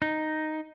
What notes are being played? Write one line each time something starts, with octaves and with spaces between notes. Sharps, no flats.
D#4